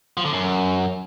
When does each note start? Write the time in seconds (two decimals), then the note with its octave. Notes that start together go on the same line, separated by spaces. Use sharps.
0.17 F3
0.25 D3
0.33 F#2